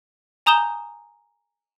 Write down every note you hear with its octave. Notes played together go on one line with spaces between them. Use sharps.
G#5 A#5 D#6 G6 E7 G7